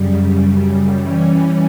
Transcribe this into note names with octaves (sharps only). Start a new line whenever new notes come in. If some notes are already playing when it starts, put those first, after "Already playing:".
Already playing: F#2 C#3 G3
E3 G3 C#4